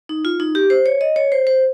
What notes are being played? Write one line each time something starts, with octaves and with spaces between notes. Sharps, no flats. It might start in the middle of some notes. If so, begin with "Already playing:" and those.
D#4
F4
D#4
G4
C5
C#5
D#5
C#5
C5
C5